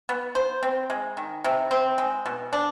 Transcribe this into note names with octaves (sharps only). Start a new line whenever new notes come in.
B3
C5
C4
G#3
D#3
C3
C4
G#3
B2
D4